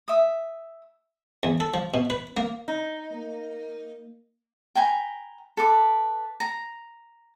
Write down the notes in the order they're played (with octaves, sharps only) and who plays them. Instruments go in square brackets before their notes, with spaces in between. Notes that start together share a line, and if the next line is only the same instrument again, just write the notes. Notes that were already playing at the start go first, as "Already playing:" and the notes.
[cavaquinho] E5 D#6
[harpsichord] E2
A4
F3
B2
B4
A#3
[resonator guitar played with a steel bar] D#4
[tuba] A#3
[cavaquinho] G5 G#5 A#5 B5
A4 B4 D6
A#5